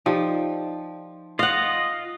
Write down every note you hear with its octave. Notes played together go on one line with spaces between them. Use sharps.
F3 D#4 G4 D5
F4 D#5 F5 F#5